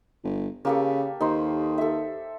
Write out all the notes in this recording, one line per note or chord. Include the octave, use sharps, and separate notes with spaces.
G1
C#3 A#3 G4 A4
D#2 D#4 C5 C6
A4 E5